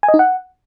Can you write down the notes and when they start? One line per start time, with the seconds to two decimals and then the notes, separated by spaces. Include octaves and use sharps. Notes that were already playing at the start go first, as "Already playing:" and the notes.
0.03 G#5
0.08 D#5
0.14 D#4
0.19 F#5